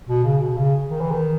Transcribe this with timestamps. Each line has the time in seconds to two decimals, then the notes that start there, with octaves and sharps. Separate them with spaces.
0.08 B2
0.24 C#3
0.41 B2
0.57 C#3
0.90 D#3
1.01 E3
1.11 D#3